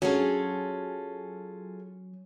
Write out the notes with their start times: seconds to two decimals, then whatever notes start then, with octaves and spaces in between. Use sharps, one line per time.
0.02 F#3 C#4 F4 G#4 A4